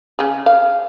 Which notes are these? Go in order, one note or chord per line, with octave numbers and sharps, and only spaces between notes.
C#3 G#4
F5